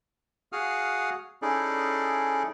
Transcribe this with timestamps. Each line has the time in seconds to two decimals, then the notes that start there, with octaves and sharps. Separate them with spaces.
0.52 F#4 G#4 F5 F#5 D#6 F6
1.42 C#4 D#4 E4 G#4 A4 D5